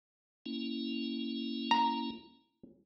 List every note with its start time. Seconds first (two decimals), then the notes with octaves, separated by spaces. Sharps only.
0.46 A#3 C#4 E4
1.71 A#5